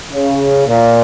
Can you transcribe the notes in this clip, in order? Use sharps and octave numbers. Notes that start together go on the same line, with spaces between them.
C#3
A#2